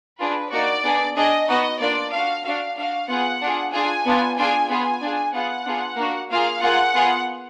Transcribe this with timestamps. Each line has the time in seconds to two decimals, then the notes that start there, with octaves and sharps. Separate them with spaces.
0.20 D4 F4 G#4 B4
0.52 A#3 D#4 F#4 D5
0.84 B3 D4 G#4
1.16 D4 G#4 D#5
1.49 B3 D#4 F#4 D#5
1.80 A#3 D4 F4 D5
2.12 D4 F#4 F5
2.44 D4 F#4 F5
2.77 D4 F#4 F5
3.09 B3 F4 G#4 F#5
3.41 D4 F4 G#4
3.74 D4 F4 G#4 G#5
4.06 B3 D4 F4
4.37 D4 F4 G#4 G#5
4.69 B3 F4 G#4 G#5
5.02 D4 F4 G#4
5.34 B3 F4 G#4 F#5
5.66 B3 D4 F4 G#4
5.98 A#3 D4 F#4
6.31 A#3 F4 G#4 F5
6.62 A#3 F4 G#4 F#5
6.95 B3 F4 G#4